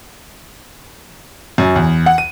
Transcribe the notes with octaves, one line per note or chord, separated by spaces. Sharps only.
F#2
E2
F#5
D#7